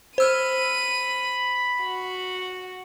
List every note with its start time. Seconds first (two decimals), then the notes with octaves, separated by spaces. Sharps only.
0.18 C5 B5 E6 F6 D#7
1.83 F#4